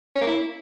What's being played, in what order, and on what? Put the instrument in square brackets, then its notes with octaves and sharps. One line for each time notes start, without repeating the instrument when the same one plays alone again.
[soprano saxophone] C#4
A#3
E4